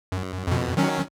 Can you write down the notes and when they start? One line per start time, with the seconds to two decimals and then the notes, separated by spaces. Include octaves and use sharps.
0.12 F#2
0.47 F2 B2
0.77 D#3 F#3 C#4